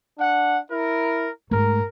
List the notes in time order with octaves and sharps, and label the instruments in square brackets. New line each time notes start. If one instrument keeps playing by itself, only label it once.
[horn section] D4 F#5
E4 A#4
[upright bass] G#2 A3 [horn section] A#4